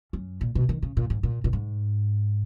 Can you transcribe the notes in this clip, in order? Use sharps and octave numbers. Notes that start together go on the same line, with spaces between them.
F#2
A#2
B2
D#3
C#3
A#2
G#2
A#2
A#2
G#2